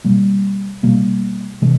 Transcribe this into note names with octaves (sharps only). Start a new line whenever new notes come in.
B2 G3 A#3
B2 G3 A#3
C3 E3 G#3